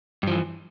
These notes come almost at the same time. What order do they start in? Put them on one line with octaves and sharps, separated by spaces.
G2 F3 E3